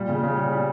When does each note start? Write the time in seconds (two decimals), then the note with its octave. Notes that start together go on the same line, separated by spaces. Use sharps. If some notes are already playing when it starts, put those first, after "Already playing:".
Already playing: A#2 G3
0.09 C#3
0.23 C#3
0.37 G3
0.52 G3